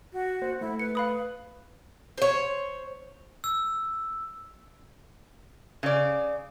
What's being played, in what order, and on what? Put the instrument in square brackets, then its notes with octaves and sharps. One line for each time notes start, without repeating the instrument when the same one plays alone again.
[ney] F#4
[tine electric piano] A#3 C5
[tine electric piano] A3 [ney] E4
[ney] B4 [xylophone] C#7
[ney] B4 [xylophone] F5 B5 D#6
[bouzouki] C5 C#5
[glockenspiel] E6
[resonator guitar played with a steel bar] C#3 D5